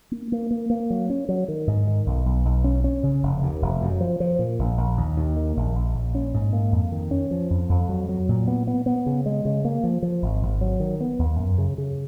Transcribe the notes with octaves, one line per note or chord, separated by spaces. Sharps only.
A#3
A#3
A#3
A#3
F#3
C#4
F#3
D#3
G#2
D#3
B1
B1
B1
C#4
C#4
C#3
F1
D#2
F1
F#2
F3
F3
A#2
A#1
A#1
D#2
D#2
D#3
A#1
A#1
A#1
C#4
G#2
A#3
F2
D#3
C#4
F3
F2
F2
F#3
F#3
A#2
B3
B3
B3
C#3
G#3
C#3
A#3
F3
F3
G#1
G#1
F#3
D#3
B3
D#2
F#2
C#3
C#3